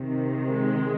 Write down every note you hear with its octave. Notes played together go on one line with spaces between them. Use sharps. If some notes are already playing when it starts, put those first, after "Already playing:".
Already playing: C3 D#3
G#3